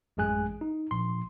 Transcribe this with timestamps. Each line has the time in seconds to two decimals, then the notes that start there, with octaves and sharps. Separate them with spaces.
0.17 A1 F#2 G#3 G#4 G#5 F#6
0.61 D#4
0.91 A#1 C6